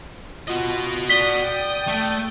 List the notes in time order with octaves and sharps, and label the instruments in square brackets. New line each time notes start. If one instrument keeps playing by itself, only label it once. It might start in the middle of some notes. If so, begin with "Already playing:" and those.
[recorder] F4 [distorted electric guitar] F#4 D#5
[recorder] D5 [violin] D#6 [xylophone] B6 G7
[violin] G5 D#6
[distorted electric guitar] A3